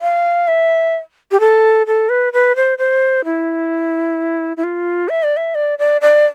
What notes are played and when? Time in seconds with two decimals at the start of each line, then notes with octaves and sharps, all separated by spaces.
0.01 F5
0.48 E5
1.31 G4
1.40 A4
1.87 A4
2.09 B4
2.33 B4
2.56 C5
2.78 C5
3.25 E4
4.57 E4
4.64 F4
5.09 E5
5.23 D5
5.37 E5
5.55 D5
5.79 D5
6.01 D5